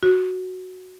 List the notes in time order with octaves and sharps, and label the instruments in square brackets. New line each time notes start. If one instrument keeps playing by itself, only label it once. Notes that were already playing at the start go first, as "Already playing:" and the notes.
[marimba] F#4